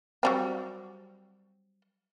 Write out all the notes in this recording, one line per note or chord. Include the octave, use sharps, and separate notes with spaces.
F#3 G3 C4